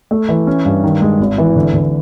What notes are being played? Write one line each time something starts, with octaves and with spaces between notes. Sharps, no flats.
A3
E3
C#4
G2
D#3
G#3
G#1
E3
D3
D3